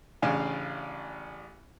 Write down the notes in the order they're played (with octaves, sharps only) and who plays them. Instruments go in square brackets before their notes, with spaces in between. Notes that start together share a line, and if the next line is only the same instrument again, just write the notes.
[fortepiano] A1 C#3 D4 F5 G#5